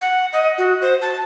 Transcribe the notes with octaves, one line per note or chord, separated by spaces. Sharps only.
F#5
D#5
F#4
C5
A5